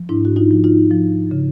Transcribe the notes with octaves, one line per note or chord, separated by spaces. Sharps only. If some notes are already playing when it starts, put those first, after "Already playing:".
Already playing: F3
G#2 D4 E4
F#4
D#4 F4
F3
D#4 F4
F3
C#3